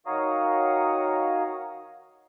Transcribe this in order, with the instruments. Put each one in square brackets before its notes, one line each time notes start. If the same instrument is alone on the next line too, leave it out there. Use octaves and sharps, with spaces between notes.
[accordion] D#3 F#4 C#5 F5 A#5 D#6